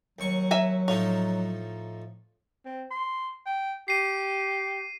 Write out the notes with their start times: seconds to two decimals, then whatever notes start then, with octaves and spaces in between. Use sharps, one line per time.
0.19 D#2 F#3 C#6
0.51 E5 G#5 A#5
0.88 A2 F3 D#4 C#5
2.65 C4
2.91 C6
3.46 G5
3.88 G4 C7 D#7